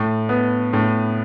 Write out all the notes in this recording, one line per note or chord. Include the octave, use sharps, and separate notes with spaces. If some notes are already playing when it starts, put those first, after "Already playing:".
Already playing: A2
B3
A2